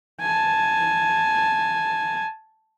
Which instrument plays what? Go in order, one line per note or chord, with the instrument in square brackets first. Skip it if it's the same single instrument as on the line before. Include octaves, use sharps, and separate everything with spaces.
[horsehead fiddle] G#5 A5